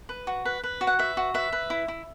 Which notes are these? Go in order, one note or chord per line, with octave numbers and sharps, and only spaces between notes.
B4
F#4
B4
B4
F#4
F#5
B4 E5
F#4
B4 E5
B4
E4
E4